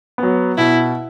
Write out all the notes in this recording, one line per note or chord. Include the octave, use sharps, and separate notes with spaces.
F#3 B3
B2 E4